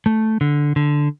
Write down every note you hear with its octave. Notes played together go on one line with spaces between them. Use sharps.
A3
D3
D3